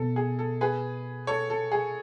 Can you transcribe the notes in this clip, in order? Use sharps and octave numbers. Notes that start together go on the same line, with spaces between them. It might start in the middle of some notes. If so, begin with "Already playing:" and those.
Already playing: B2 B3 A4
G#4
A4
G#4 B4
A4 C#5
A4
G#4